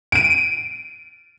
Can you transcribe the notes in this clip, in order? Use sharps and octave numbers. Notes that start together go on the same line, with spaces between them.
D7 D#7